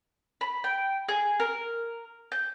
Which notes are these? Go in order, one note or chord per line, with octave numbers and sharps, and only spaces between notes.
B5
G5
G#4
A#4
G6